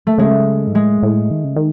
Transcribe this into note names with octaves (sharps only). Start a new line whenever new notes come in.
A3
C#3 G#3
G#2
A2 G#3
A2
D#3
C#3
D#3